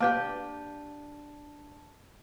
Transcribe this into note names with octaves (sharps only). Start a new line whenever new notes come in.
A#3 D4 G4 B4 A5